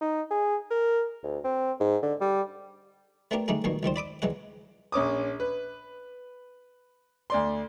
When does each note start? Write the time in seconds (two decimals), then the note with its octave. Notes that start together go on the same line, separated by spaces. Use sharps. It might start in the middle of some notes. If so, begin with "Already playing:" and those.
0.02 D#4
0.31 G#4
0.71 A#4
1.24 D2
1.44 C4
1.80 G#2
2.03 D3
2.21 G3
3.31 A3 B3 D4 G4 A#4
3.48 D3 G3 A3 D#4 G#4
3.64 A#1 G2 B2 D#3 A#3
3.83 C#2 D#3 G3 C5
3.96 D5 B5 D6 D#6
4.22 C2 E3 G#3 F#5
4.92 A#1 C#4 D6 D#6
5.40 B4
7.30 D2 D5 C6